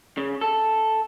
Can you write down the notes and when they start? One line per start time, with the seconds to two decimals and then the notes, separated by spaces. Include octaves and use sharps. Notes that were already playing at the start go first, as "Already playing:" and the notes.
0.17 C#3
0.41 A4